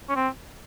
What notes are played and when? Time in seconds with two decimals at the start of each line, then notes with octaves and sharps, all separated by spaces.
0.09 C#4
0.16 C4